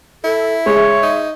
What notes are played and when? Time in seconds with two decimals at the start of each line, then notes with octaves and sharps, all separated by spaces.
0.24 E4 A4
0.66 G#3 C#5 E5
1.03 D#4